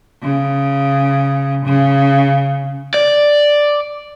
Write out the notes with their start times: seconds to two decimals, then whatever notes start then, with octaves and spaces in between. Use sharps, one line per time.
0.22 C#3
1.65 C#3
2.94 D5